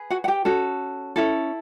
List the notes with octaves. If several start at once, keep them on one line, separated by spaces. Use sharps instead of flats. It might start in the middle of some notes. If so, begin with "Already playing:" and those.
Already playing: G#4 B4
F#4 F#5
F#5
G4 G5
C#4 F#4 A4
C#4 E4 A4